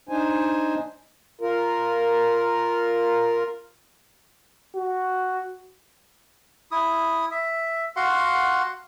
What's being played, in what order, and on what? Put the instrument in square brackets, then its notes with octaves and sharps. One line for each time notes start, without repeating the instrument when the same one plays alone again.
[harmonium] D4 D#4 C5 G#5
F4 A#4
[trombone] F#4
[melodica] E4 D#6
E5
F#4 F5 F#5 C6